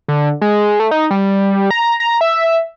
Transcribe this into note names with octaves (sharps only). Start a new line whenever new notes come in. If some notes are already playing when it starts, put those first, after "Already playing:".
D3
G#3
A3
D#4
G3
A#5
A#5
E5